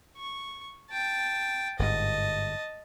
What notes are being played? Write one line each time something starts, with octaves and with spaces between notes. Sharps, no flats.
C#6
G5 A5
G1 G#2 D#5 A5